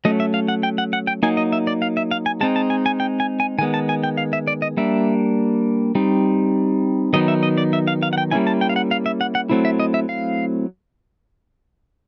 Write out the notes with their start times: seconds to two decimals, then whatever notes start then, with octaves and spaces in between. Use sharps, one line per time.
0.05 F#3 A3 C#4 D#5
0.20 E5
0.34 F5
0.48 F#5
0.63 G5
0.78 F#5
0.93 F#5
1.07 G5
1.23 F#3 A#3 D#4 G#5
1.37 D#5
1.53 E5
1.67 D5
1.82 F5
1.97 E5
2.11 F5
2.26 G#5
2.41 G#3 C4 D#4 A5
2.56 A5
2.70 G#5
2.86 G#5
3.00 G5
3.20 G#5
3.40 G#5
3.58 D#3 G#5
3.61 G#3 B3
3.74 A5
3.89 G#5
4.04 G5
4.18 F5
4.33 E5
4.47 D5
4.62 D#5
4.77 G3 A#3 D4 E5
5.95 G3 C4 D#4
7.13 D#3 F#3 B3 D#4 D#5
7.28 E5
7.43 D#5
7.58 D5
7.73 E5
7.87 F5
8.03 F5
8.13 F#5
8.18 G5
8.31 G3 A#3 C#4 E4 G#5
8.47 A5
8.61 G5
8.69 F5
8.76 F#5
8.91 F5
9.06 E5
9.21 F#5
9.35 F#5
9.49 F#3 A3 C4 E4
9.65 E5
9.80 D#5
9.94 E5
10.09 F5